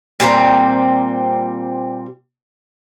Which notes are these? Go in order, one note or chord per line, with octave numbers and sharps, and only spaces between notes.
A#2 G3 C4 A#5